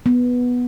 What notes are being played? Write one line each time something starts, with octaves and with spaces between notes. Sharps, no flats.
B3